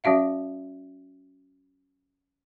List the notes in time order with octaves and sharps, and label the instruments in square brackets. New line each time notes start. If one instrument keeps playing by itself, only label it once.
[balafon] F#3 C#4 F#4 E5 F5